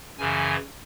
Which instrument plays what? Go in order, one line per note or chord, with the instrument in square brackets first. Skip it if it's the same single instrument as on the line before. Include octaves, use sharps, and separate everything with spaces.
[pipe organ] F#2 C#3 E3 G#5